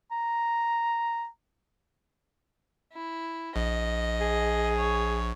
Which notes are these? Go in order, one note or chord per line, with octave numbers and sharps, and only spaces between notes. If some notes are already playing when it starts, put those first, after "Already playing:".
A#5
E4
A#1 D#5
G#4
C#5